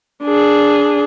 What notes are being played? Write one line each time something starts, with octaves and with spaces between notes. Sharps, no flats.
D4 G#4